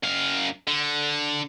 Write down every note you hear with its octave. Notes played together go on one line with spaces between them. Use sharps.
F#2 F5
D3